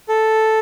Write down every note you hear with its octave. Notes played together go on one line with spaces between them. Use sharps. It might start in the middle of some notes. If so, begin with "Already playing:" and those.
A4